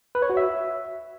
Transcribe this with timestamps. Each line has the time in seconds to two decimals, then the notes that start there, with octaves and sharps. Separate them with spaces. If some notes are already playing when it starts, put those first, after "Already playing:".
0.15 B4
0.22 C#5
0.30 F#4
0.37 E5